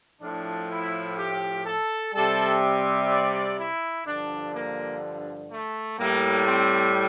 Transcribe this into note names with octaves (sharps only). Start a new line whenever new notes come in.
A2 F3 D4
E4
G4
A4
C3 G3 A4
D5
E4
G2 D3 F3 D4
A#3
A3
A2 G3 A#3
C4